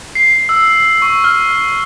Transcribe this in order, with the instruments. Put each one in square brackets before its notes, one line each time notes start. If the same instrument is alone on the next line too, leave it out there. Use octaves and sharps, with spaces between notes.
[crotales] C7
E6
C#6
F6